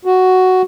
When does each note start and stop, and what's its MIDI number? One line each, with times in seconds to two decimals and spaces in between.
0.05 0.62 66